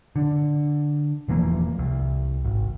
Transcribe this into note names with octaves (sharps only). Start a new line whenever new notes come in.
D3
E1 E3 F3 A#3
C2
G#1